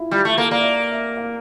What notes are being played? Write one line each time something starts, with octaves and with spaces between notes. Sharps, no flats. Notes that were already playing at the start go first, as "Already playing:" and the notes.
Already playing: E4 F4
G3 F4
A3
A#3 A4
A#3 D5
E5
D5
E5
F5